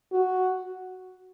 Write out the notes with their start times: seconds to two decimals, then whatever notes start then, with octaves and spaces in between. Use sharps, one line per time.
0.12 F#4